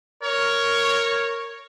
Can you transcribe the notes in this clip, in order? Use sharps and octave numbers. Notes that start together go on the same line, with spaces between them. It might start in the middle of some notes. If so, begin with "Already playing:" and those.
A#4 C#5